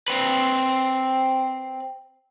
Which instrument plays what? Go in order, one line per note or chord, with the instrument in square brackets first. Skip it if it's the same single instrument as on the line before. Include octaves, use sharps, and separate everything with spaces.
[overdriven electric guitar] C4 B4